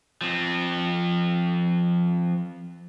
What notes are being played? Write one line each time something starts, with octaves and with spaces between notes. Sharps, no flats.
F3 C4